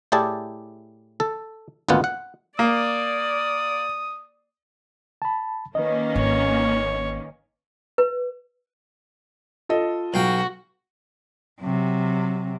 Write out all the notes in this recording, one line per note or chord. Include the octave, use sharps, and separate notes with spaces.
A2 E4 G4 G#4 D5 A5
A4
G#1 D2 A#2 B3 F4 F#5
F#5
A#3 D5 D#6
A5 B5
D#3 A#3 C#4 B4 D#5
G#1 C#5
B4
F4 A4 D#5
B1 F#4 F5 G5
C3 F#3